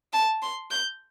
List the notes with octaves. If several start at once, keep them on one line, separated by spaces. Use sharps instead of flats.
A5
C6
G6